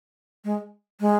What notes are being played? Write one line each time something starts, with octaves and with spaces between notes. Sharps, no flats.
G#3
G#3